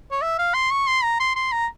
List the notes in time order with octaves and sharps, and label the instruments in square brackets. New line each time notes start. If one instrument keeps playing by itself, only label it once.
[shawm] C#5
E5
F5
C6
C#6
C6
A#5
C6
C6
A#5